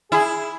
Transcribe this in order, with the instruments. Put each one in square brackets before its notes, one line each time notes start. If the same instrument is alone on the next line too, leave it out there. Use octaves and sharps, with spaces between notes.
[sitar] E4 [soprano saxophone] G#4